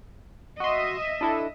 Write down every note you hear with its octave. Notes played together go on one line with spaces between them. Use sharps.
F#4 D#5 E5 C6
D4 E4 A4